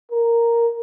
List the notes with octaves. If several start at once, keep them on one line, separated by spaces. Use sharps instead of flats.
A#4